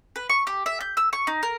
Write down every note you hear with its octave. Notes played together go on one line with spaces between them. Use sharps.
B4
C#6
G4
E5
G6
E6
C#6
D#4
A#4